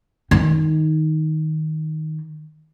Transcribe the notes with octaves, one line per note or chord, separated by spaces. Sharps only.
D#3 D#4